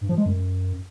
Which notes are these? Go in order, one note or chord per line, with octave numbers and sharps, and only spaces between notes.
G2
F3
G#3
F#2